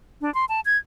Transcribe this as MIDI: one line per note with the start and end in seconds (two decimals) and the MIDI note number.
0.21 0.32 62
0.34 0.45 84
0.49 0.60 81
0.66 0.77 92